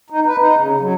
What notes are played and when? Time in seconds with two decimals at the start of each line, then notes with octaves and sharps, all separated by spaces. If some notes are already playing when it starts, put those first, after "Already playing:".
0.10 D#4
0.26 B4
0.38 D#4
0.58 C#3
0.81 F#3